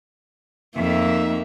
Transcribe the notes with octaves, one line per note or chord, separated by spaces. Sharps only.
F2 A#3 D#4 E5